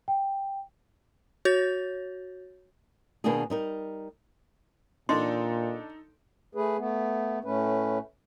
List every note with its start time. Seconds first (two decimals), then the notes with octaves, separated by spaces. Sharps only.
0.08 G5
1.45 F#4 C#5 G6 A6
3.24 B2 D#3 A#3 B3 D4 G#4
3.50 G3 D#4 A#4
5.09 A#2 D4 D#4 A4 C6
6.55 A3 G#4 B4
6.78 A3 B3
7.44 A2 A3 C#4 B4